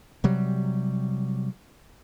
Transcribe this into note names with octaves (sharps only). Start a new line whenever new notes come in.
C3 F#3 G3